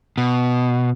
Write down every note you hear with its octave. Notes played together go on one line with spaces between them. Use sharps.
B2